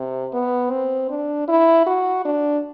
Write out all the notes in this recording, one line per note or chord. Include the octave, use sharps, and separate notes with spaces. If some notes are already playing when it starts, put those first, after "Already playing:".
Already playing: C3
B3
C4
D4
E4
F#4
D4